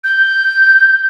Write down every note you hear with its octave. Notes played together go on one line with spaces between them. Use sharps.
G6